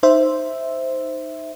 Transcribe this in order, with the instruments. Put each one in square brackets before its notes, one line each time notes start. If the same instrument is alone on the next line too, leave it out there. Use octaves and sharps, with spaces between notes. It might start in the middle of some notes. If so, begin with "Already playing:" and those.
[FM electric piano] D#4 C5 E5